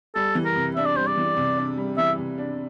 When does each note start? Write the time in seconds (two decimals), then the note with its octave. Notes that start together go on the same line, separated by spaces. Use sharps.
0.15 G3 A4
0.35 E3
0.45 A#4
0.56 C3
0.76 D4 E5
0.86 D5
0.97 G3 C5
1.07 D5
1.17 E3
1.37 C3
1.57 D4
1.77 G3
1.98 E3 E5
2.18 C3
2.38 D4